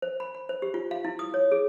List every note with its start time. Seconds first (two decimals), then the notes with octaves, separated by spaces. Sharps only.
0.02 C5
0.20 B5
0.35 B5
0.49 C5
0.62 G4
0.74 F4
0.91 F5
1.05 E4
1.19 D#6
1.34 C#5
1.52 G#4